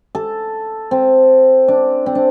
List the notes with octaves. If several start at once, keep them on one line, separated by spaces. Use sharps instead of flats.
A4
C4
D4
C4
D4